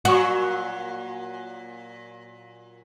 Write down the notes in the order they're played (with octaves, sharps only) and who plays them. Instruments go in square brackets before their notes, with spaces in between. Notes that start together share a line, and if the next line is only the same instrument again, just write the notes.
[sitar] A#2 F#3 [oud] F#4